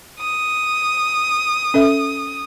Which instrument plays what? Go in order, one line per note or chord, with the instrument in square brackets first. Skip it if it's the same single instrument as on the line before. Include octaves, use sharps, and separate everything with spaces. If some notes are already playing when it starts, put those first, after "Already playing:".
[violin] D#6
[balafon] C#4 A4 E5